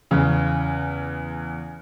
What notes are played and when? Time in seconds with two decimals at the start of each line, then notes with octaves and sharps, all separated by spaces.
0.11 E2 C#3